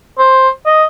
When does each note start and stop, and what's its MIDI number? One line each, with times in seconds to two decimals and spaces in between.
0.18 0.49 72
0.66 0.85 75